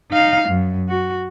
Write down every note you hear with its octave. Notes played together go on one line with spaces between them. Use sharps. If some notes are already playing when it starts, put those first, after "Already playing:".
D#4 F5
F#2
F#4